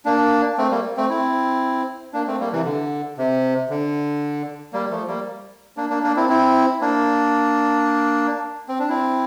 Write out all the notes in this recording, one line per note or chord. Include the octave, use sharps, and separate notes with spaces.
A#3 D4
A3 C4
G3 A#3
A3 C4
C4 E4
A#3 D4
A3 C4
G3 A#3
C3 E3
D3
C3
D3
G3 A#3
F3 A3
G3 A#3
A#3 D4
A#3 D4
A#3 D4
C4 E4
C4 E4
A#3 D4
C4
D4
C4 E4